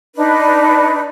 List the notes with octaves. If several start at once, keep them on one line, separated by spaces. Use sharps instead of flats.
D4 D#4 B4